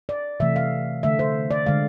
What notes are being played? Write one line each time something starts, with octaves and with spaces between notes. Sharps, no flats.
D5
C3 E3 A3 E5
F5
D3 A3 E5
C5
D5
D3 G#3 F5